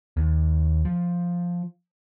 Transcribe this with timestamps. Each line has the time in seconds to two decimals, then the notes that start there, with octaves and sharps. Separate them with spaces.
0.17 D#2
0.85 F3